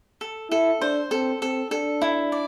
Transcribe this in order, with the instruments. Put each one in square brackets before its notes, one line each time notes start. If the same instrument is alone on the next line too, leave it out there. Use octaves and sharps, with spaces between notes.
[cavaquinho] A4
[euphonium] E4 [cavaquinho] A4
[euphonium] D4 [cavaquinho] C5
[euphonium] C4 [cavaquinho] A4
[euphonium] C4 [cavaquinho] A4
[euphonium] D4 [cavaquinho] A4
[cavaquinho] E4
D5